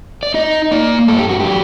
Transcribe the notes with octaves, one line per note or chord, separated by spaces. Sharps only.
D5
D#4 D#5
A#3 D5
G2 A4
G4
F#4
G4
F#3